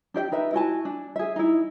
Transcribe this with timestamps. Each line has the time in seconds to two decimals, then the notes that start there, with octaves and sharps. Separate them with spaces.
0.14 D4 G4 E5 G5
0.32 D#4 B4 E5
0.53 E4 F#4 G#5 A5
0.85 D4
1.16 G#4 E5
1.36 D#4 E4